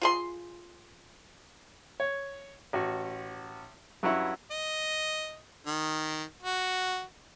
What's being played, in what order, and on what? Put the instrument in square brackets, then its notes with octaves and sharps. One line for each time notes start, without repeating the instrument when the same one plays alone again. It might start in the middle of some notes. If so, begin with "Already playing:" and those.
[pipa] F4 G#4 C6
[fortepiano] C#5
A1 F#4
G2 F#3 C#4 E4 F#5
[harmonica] D#5
D#3
F#4